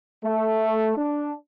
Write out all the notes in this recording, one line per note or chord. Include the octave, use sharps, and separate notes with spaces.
A3
D4